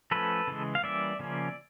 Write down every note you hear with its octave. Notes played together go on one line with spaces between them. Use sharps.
F3 A3 C#4 A4 B4
C#3 E3 G#3
F5
E3 G3 A#3 C#4 D5 E5
C#3 F3 A#3 C#4